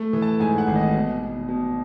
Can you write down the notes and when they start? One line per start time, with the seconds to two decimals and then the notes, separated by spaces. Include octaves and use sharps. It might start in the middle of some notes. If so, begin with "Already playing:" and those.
Already playing: A3
0.13 E3
0.22 A5
0.40 G#2 G#5
0.58 F#5
0.67 G#1
0.75 D#5
0.94 B2
1.21 B2
1.48 B2